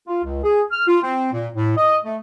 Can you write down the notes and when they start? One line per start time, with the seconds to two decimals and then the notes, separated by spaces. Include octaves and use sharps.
0.07 F4
0.24 C#2
0.44 G#4
0.72 F6
0.87 F4
1.03 C4
1.32 A#2
1.54 A2
1.77 D#5
2.05 A3